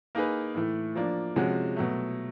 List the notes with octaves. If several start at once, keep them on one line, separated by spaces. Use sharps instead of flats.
A#3 D#4 G#4 B4
A2 E3 A3
F3 A#3 D4
C3 F3 G#3 C#4 F#4
B2 F#3 A3